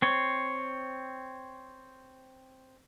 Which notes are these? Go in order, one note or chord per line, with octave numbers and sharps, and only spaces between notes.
C4 C#5